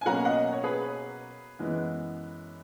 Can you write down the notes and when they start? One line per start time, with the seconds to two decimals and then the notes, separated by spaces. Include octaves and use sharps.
0.01 G#5
0.06 B2 F#3 A#3 C#4 F#5 A#5
0.25 D#5 F#5
0.53 C#5
0.64 G#4 B4
1.59 F#2 E3 G#3 B3